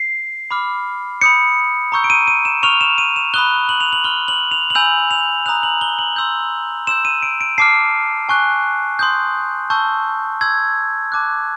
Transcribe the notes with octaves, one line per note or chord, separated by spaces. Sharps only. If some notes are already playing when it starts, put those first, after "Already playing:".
Already playing: C7
B5 D6 F6
B5 D#6 G6 C#7
A#5 C#6 E6 G6
D7
D#7
D#7
E7
C#6 F6 F7
E7
D#7
E7
B5 D#6 F#6 G7
F#7
F7
F#7
C6 F6 G7
F#7
F7
F#7
G#5 B5 E6 G6 F7
F7
A#5 D#6 F#6 F7
F#7
G7
F#7
C6 E6 G6
C6 E6 G6 E7
D#7
D7
D7
A5 D6 F6 C7
G#5 C#6 F#6
C6 D#6 G6
A5 C#6 E6 G6
C6 E6 G6 G#6
A5 D6 F#6